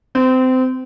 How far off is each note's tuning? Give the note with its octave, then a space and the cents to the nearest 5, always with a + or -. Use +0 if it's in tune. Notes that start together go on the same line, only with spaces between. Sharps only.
C4 -25